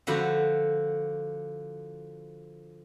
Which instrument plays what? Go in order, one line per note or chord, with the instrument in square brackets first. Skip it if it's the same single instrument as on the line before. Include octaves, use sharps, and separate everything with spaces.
[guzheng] D3 F3 F#4 B5